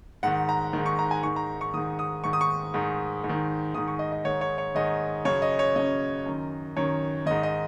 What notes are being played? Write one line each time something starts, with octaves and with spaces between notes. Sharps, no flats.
G#2 D#3 F#5
A#5
G#2 D#3
C#6
A#5
G#5
G#2 D#3 C#6
A#5
C#6
G#2 D#3 D#6
D#6
G#2 D#3 C#6
D#6
C#6
G#2 D#3
G#2
D#3
G#2 D#3 D#6
C#6
D#5
D#5
G#2 D#3 C#5
C#5
C#5
G#2 D#3 D#5
F#2 C#3 C#5
D#5
C#5
F#2 C#3 D#5
F#2 D#3
F#2 D#3 C#5
G#2 D#3 D#5
D#5